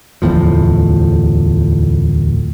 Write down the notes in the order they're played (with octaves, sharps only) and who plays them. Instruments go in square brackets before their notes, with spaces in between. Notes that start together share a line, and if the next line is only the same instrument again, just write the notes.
[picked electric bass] D1 E2 A2 F3